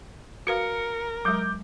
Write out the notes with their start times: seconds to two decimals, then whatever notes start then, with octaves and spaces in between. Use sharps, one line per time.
0.47 F#4 A#4 B4 F5 C#7
1.25 F#3 G#3 D6 G6